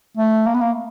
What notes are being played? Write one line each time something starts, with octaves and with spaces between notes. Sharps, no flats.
A3
A#3
B3
A#3